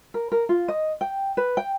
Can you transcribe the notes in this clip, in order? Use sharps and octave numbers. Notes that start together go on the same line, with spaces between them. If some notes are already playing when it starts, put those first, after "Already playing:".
A#4
A#4
F4
D#5
G5
B4
G5